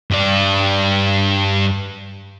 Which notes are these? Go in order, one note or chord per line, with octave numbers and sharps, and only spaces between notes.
G2 D5